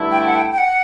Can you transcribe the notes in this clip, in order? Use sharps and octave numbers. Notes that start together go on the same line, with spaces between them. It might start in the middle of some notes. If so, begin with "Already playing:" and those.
Already playing: G2 D3 A3 E4
G5
F#5
G5
G5
F#5